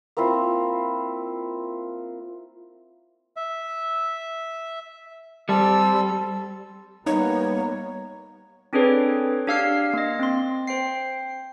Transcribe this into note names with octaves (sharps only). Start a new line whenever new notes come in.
A#3 C4 E4 F4
E5
G3 C4 A4 E6
G3 A#3 B3 D#4 C#5 A#5
C4 D4 G#4 A4 B4 C#5
D4 G4 F5 E6 F6 C7
A#3 D#5
C4 C6
C5 G5 C7